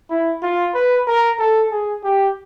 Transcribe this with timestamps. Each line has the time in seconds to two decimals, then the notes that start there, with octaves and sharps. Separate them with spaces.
0.10 E4
0.42 F4
0.74 B4
1.07 A#4
1.39 A4
1.71 G#4
2.04 G4